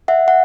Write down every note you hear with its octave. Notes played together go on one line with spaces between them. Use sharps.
E5 F#5
F#5